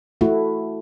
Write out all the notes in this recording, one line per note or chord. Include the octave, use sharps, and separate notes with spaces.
A3 E4 F#4